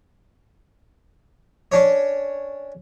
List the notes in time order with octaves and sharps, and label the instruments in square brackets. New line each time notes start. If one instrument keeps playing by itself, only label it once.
[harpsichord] C#4 D4 C#5